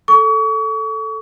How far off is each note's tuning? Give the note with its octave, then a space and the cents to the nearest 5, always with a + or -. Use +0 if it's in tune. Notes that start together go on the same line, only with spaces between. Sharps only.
A4 +0 C#6 +35